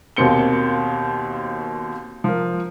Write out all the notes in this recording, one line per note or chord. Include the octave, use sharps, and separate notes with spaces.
D#2 B2 A#3 C4 C#7 G7
F3 A#4